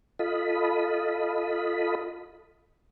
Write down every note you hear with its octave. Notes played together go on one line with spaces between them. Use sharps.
F4 A4 D#5 B5